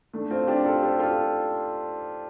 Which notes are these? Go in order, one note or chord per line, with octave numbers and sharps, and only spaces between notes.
A3 D4
C4 F4
D4 G4
F4 A4
G4 C5
F4 A4